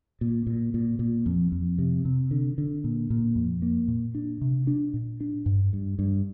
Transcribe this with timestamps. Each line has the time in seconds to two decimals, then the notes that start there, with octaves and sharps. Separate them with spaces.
0.21 A#2
0.47 A#2
0.74 A#2
0.99 A#2
1.26 F2
1.52 F2
1.79 C3
2.05 C3
2.31 D3
2.58 D3
2.84 A#2
3.10 A#2
3.35 F2
3.62 A#3
3.88 A#2
4.15 D4
4.41 C3
4.67 D4
4.94 A#2
5.20 D4
5.46 G2
5.73 G2
5.99 G2